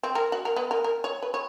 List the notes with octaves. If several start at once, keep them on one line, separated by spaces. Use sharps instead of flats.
C4
A#4
F#4
A#4
B3
A#4
A#4
C#5
B4
C#5